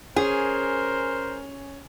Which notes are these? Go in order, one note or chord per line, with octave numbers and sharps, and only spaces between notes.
C#4 G#4 A#4 C5